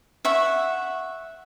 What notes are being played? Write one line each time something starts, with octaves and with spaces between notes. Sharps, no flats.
E5 F#5 C#6